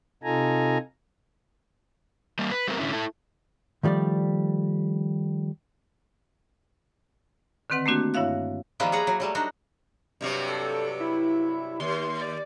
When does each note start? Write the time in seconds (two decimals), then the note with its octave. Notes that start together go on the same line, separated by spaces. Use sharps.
0.23 C3 D#4 F4 A4 G#5 A#5
2.39 G3 A#3
2.51 B4
2.68 G3 A3 B3 C4 G4 A#4
2.79 A2 D3 C#4 E4
2.92 E4 A4
3.83 D#3 F3 G3 A3 D5
7.70 D3 D#3 C4 B4 F#5
7.86 A3 A#3 C4 D4 F#4 G4
8.14 G2 E4 C#5 E5 F5 F#6
8.80 D#3 F3 G3 A#3 B3 E4
8.92 G#4 C#5 F#5 A#5
9.07 F#3
9.20 F#3 G3 A3
9.35 D4 D#4 F#4
10.21 G2 C3 F#3
10.49 A4
11.00 E4
11.80 D#2 C6
12.21 D5